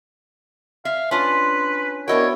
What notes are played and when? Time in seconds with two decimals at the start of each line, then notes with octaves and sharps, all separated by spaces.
0.85 E5 F5
1.11 C#4 D4 F4 B4 C6
2.08 B3 D4 E4 F#4 A#4 C#5 D#5 G5